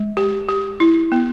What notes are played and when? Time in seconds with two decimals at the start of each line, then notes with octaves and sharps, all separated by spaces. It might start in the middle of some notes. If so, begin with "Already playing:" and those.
Already playing: G#3
0.17 G4
0.49 G4
0.80 E4
1.12 B3